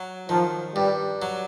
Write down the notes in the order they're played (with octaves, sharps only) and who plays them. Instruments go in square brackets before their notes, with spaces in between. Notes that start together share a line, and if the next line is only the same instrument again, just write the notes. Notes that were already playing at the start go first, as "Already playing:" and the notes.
Already playing: [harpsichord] F#3
[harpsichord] D#3 [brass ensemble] F3
[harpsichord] G2 [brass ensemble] G3
[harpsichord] F#3